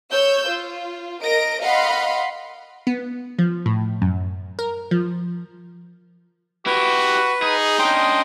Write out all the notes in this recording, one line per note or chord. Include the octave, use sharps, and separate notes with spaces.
C#5 E6 G6
F4
A#4 D#5 A#6 D7
D#5 F5 F#5 B5 C6
B3
F3
A2
F#2
A#4
F3
E4 F#4 G4 B4
D#4 G#4
C#4 D4 D#5 G5 C6